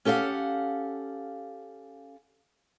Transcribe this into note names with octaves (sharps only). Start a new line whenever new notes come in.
C#4 G4 A4 F5 F#5